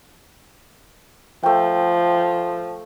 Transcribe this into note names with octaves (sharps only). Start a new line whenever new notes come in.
F3 A3 G5